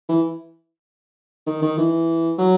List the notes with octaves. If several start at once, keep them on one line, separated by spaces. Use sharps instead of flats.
E3
D#3
D#3
E3
F#3